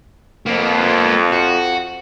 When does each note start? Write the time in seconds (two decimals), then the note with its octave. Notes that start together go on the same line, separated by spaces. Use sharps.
0.46 F2 A#3 B3
1.32 F#4